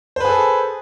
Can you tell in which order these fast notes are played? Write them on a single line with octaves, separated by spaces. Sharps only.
C5 B4 G#4 A4